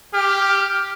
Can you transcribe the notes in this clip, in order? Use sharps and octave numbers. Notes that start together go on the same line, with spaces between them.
G4 F6